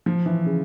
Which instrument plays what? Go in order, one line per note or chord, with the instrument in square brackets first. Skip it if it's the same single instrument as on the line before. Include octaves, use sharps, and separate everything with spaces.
[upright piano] F3
E3
C#3